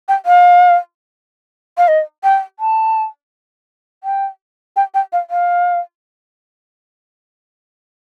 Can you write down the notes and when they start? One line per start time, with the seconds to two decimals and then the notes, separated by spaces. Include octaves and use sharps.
0.08 G5
0.26 F5
1.78 F5
1.88 D#5
2.24 G5
2.60 A5
4.04 G5
4.76 G5
4.94 G5
5.13 F5
5.30 F5